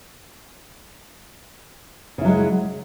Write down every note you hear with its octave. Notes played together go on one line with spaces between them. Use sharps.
C#3 F#3 G#3 E4